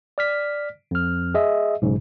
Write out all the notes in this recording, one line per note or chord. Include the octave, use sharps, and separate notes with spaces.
D5 F6 B6
F2 F6
G#4 D#5 E5
B1 G#2 C#3